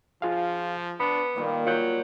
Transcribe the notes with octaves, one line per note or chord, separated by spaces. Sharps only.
F3 F4 G#4 F5
B3 D4 B5
A#2 D#3 G3
F#3 F4 G6